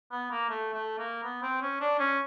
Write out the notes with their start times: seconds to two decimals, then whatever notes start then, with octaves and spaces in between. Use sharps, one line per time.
0.11 B3
0.30 A#3
0.49 A3
0.74 A3
0.98 A#3
1.23 B3
1.42 C4
1.62 C#4
1.81 D4
1.99 C#4